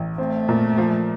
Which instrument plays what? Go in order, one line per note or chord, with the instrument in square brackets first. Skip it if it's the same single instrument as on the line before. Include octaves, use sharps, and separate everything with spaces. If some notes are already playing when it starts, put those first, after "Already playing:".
Already playing: [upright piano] A1
[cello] A3 [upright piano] C4
[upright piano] A#2
F3